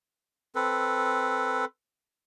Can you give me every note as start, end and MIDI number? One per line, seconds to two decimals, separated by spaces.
0.55 1.65 60
0.55 1.65 69
0.55 1.65 71